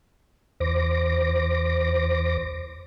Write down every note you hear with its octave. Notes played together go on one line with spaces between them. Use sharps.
E2 C5 D6 A#6